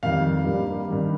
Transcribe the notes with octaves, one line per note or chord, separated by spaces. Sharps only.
F2 D#3 G3 F5
G2 G3 A#3
G2 D#3 G3